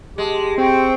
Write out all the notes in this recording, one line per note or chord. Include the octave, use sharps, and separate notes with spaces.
G#3 G4 A5 D6
C4 G5 C#6